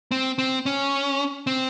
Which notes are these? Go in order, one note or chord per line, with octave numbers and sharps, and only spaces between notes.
C4
C4
C#4
C4